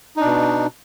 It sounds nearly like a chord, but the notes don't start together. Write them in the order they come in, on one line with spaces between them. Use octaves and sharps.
D#4 D4 B2